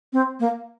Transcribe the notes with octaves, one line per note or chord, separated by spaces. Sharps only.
C4
A#3